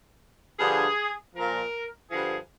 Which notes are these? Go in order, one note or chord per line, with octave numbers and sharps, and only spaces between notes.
G2 D3 F3 G#4
A#2 F3 A#4
G2 D3 F3 G#4